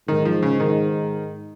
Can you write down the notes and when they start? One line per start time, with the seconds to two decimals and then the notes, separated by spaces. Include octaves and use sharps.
0.08 G#2 D#3
0.25 F3
0.43 C#3
0.60 D#3